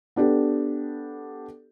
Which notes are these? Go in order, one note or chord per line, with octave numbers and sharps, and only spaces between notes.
B3 D4 G4 A4